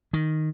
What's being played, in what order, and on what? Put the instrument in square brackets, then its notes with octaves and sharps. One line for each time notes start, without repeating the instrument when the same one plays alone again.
[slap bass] D#3